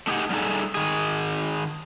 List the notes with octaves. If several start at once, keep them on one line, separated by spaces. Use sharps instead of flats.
A3 D#4 G4 G#4 F#5
G3 A3 D#4 G#4 A4
D#3 G#4